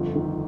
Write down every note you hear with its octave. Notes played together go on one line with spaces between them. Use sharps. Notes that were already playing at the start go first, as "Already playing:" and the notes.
Already playing: G1 F2
D#3